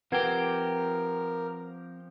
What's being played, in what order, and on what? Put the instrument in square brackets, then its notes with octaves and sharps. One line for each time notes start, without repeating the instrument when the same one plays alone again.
[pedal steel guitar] F3 G4 [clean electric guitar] C4 G5 [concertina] A#4 [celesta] B4 F#5 G#6